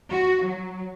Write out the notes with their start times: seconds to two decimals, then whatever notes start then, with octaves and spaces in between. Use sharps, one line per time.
0.11 F#4
0.43 F#3